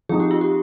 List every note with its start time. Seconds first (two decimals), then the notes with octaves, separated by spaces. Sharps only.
0.09 F3 C4 D#4 G#4
0.20 G4
0.31 F4
0.41 G4